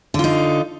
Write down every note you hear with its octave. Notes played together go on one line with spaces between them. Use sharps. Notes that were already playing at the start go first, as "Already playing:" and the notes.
D3 D#4 F4